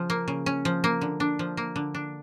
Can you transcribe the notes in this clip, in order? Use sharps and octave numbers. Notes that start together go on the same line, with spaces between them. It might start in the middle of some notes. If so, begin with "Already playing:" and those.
Already playing: C#3 F3 C#4
A#3
C#3
C#4
F3
A#3
D3
D4
F3
A#3
D3
D4